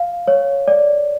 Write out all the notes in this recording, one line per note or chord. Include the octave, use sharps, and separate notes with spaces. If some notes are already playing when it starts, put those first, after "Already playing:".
Already playing: F5
C#5
D5